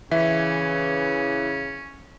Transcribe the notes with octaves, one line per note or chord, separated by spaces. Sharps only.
C#3 E3 C#4 E5